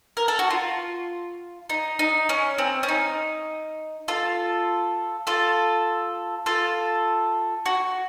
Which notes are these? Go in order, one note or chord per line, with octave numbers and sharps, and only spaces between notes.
A#4
A4
F#4
F4
D#4
D#4
C#4
C4
C#4
D#4
F4 A4
F4 A4
F4 A4
F#4